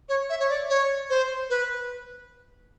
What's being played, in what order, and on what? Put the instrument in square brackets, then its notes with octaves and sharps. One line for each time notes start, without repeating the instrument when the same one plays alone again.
[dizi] C#5
E5
C#5
D5
C#5
C5
B4